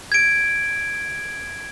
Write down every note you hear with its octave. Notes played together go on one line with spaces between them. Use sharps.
G#6 D7